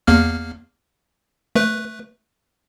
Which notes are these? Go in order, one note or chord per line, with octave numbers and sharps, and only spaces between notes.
E2 A#3 F6
A3 B4